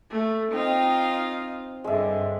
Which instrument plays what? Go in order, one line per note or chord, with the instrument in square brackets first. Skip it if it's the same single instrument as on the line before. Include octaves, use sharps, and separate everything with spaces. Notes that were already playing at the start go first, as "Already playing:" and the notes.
[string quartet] A3
[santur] C4 [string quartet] D#4 F4 F5
[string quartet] G2 D3 [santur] G#3 E5